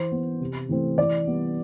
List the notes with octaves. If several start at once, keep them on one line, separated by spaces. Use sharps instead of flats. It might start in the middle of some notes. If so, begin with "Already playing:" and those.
Already playing: E3 C5
B3
C3
E3 A3 C4
E3 D5
G3 B3